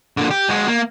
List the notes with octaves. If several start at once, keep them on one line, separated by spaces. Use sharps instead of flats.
A#2 D3
G4
G#3 F#4
A#3